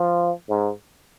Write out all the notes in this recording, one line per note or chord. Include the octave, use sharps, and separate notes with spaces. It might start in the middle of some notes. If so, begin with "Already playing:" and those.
Already playing: F3
G#2